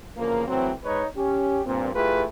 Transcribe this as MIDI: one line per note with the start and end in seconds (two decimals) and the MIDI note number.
0.17 0.46 40
0.17 0.46 49
0.17 0.46 53
0.17 0.46 58
0.48 0.72 45
0.48 0.72 52
0.48 0.72 54
0.48 0.72 60
0.84 1.05 56
0.84 1.05 63
0.84 1.05 71
0.84 1.05 73
1.17 1.60 61
1.17 1.60 67
1.65 1.93 43
1.65 1.93 46
1.65 1.93 60
1.94 2.24 57
1.94 2.24 64
1.94 2.24 65
1.94 2.24 67
1.94 2.24 68
1.94 2.24 71